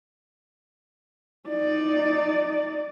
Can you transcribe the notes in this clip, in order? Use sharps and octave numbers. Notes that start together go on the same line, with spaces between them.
D#4 D5